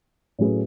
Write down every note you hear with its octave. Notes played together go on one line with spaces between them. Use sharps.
A2 F#3 C#4 G#4 B4